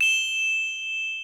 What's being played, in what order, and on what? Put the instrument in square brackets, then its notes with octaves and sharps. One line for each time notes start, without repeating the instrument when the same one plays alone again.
[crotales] E7 G7